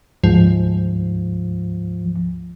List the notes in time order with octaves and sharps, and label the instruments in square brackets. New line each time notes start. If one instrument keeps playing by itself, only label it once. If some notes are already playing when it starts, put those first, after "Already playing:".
[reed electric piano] D2 G#2 [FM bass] F3